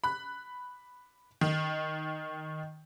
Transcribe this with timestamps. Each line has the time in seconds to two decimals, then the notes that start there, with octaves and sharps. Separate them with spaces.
0.04 B5 F#6
1.41 D#3